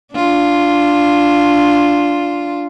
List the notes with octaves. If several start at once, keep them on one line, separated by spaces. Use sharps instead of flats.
D4 F4